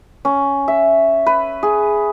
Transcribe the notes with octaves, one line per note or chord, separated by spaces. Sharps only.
C#4
E5
B4
G#4